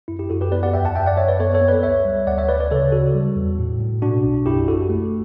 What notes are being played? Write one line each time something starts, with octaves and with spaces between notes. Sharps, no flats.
F#2 E4
E4 G4
F#2 F#4 A4
G4 B4
B3 B4 D5
D5 F#5
E2 E5 G5
F#5 A5
F#2 E5 G5
D5 F#5
F#2 C#5 E5
B4 D5
B3 A4 C#5
A4 C#5
B3
B4 D5
C#2 C#5 E5
G3
D2 D5 F#5
C#5 E5
D2 B4 D5
B4 D5
C#3 A4 C#5
C#3 F#4 A4
G3
E2
A2
A2
B2 D4 F#4
B1
F#2 E4 G4
G1 F#4 A4
A3